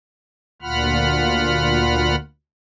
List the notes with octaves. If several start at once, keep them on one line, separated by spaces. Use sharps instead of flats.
D2 A#2 F4 F#5 B5 F6